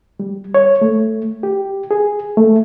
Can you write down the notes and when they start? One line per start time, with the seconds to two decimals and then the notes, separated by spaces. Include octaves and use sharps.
0.20 G3
0.54 C#5
0.81 A3
1.43 G4
1.91 G#4
2.37 A3